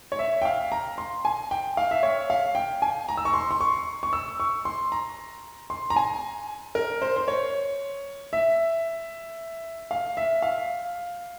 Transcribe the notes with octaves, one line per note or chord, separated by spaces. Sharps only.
C#5
E5
G5
F5
A#5
C6
G#5
G5
F5
E5
C#5
F5
G5
G#5
A#5
E6
C#6
C6
C6
C#6
C#6
E6
C#6
C6
A#5
C6
A#5
G#5
A#4
C5
C5
C#5
E5
F5
E5
F5